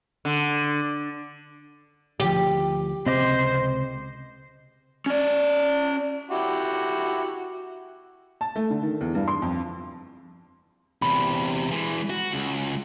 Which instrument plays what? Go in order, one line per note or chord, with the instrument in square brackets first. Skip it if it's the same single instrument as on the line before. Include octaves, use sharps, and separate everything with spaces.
[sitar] D3
[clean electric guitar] D2 F3 [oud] G4
[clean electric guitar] C#2 C3 [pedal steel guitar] C4 D#5 D6 [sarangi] C5
[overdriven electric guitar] C#4 D5
[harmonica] E4 F#4 G4
[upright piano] A5
A3
D3
D#3
E2
G2
C6
F2
[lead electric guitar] E2 C3 [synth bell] B5
[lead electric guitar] E3 G#3
F#4
C#2